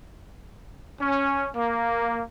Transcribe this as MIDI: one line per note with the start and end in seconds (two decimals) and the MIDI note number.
1.00 1.48 61
1.55 2.22 58